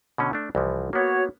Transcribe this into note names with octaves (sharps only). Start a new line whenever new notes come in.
B2 D3 C#4
A3 D4
C2 E3 F3
A#3 B3 F#4 C#5